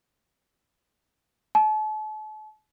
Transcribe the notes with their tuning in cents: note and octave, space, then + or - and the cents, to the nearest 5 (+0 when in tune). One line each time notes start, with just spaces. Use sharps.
A5 -40